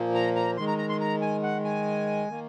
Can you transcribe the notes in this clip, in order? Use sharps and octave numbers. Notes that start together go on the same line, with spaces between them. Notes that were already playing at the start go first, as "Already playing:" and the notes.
Already playing: A#2 F3 A#3
A#5
A#5
D#3 G#3 C6
A#5
A#5
C6
A#5
G#5
F#5
G#5
D#3 A#3